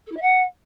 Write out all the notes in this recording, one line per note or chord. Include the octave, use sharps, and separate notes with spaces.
A4
E4
E5
F#5